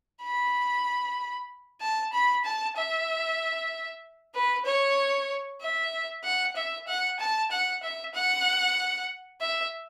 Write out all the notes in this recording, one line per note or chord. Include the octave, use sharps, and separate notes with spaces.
B5
A5
B5
A5
E5
B4
C#5
E5
F#5
E5
F#5
A5
F#5
E5
F#5
E5